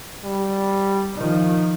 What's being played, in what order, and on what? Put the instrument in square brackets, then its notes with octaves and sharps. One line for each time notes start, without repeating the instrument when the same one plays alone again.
[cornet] G3
[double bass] D#3 F3